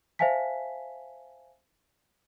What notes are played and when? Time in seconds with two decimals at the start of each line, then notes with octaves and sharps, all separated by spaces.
0.19 C5 E5 F5 G#5 A5 B6